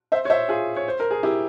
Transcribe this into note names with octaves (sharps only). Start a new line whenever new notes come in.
C5 E5
C#5
C5 E5
F4 G#4
C#5
C5
A#4
G#4
E4 G4